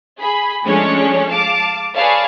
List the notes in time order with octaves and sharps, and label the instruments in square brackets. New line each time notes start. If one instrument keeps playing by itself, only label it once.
[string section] G#4 B5
F3 G#3 A3 C#4 D4 C#5
F5 A5 D6
G#4 B4 C#5 D5 F5 A5